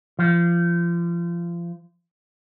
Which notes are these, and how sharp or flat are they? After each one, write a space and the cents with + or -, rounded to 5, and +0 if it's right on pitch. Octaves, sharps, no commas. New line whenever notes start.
F3 -30